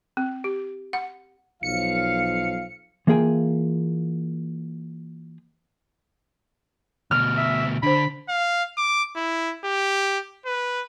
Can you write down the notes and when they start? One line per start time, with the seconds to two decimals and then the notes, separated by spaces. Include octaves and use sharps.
0.17 C4
0.44 G4
0.93 F#5
1.63 B1 F3 F5 C#7
3.07 E3 A#3 F4 G#4 G5 G#5
7.11 D2 B2 F6
7.38 E5
7.83 D3 D4 C5 B5
8.29 F5
8.78 D6
9.17 E4
9.65 G4
10.46 B4